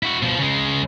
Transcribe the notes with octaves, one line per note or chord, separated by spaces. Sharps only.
E4 F#4
B2 F3
C#3 G#3